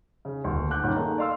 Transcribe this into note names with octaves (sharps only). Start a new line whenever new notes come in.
C#3
D#1 D2
F#5 D6 F#6 G6
G2 A#2 D#3 C#4
A3 A#3 D#4 G#4
D5 D#5 F5 C6 E6